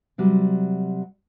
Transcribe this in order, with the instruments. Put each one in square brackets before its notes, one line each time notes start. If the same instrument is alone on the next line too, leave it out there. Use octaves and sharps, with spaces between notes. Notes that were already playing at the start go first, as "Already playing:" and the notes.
[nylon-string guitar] C3 F#3 G3